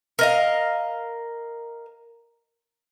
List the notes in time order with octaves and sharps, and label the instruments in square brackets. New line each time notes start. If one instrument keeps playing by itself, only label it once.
[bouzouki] A#4 D#5 F5